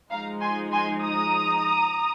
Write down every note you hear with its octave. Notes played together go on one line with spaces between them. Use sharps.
F3 G#3 D#4 F5 A#5
G#5 C6
G#5 C6
A#5 D#6